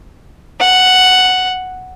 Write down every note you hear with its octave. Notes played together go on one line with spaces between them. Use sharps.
F#5